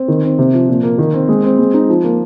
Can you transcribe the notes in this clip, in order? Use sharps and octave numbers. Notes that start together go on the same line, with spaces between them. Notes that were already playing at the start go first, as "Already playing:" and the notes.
Already playing: C4
D#3
C4
C3
F3
A#2
A#3
D#3
C4
G#3
C4
G#3
D#4
F3
A#3